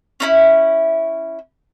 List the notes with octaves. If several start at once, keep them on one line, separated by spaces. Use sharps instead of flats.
C#4 D#4 E4